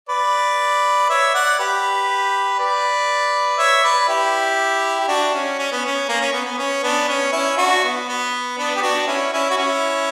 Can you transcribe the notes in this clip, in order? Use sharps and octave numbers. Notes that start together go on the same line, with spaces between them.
B4 D5
C#5 E5
D5 F#5
G4 B4
B4 D5
C#5 E5
B4 D5
E4 G4
G4
D4 F#4
C#4
C#4
B3
C#4
A#3
C#4
B3
B3
C#4
B3 D4
C#4
C#4 E4
D4 F#4
B3
B3
B3 D4
G4
D4 F#4
C#4 E4
C#4 E4
F#4
C#4 E4